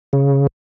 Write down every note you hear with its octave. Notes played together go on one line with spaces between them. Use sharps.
C#3